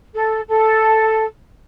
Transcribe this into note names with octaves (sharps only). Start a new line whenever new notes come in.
A4
A4